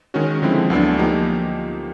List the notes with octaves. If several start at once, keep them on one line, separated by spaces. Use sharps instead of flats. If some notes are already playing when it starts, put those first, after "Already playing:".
D#3 G#3 C#4 F#4
D3 F3 G#3 C4 E4
D2 D3 F#3 B3 D4
F3 A#3 D#4 G4